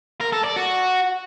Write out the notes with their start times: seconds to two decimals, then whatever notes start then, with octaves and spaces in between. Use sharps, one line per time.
0.21 A#4
0.33 A4
0.44 D5
0.56 F#4